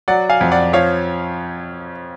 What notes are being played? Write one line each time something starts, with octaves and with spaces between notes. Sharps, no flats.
F#3 D5 F#5
F5 G#5
F2
D5 F#5
F3 C#5 F5